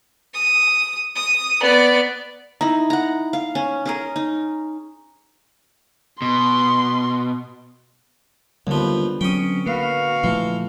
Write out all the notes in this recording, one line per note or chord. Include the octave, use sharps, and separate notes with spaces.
D#6
D#6
B3 D5
D#4 E4
F#5 A#5
F5
C#4
C#4 G#4 A#4
D#4
B2 C6
D#2 D3 F3 G3 B3
F#3 C4 C#4 G5 D#6
A#3 F#4 B4 F5
A#2 E3 F3 A3